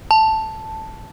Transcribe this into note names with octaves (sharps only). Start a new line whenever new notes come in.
A5